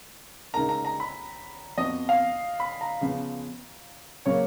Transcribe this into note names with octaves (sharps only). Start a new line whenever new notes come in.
C#3 G#3 D#4 A#4 A#5
A#5
A#5
B5
F2 F3 B3 F#4 B4 D#5
F5
B5
A#5
C#3 F3 B3
C#3 F#3 A#3 C#5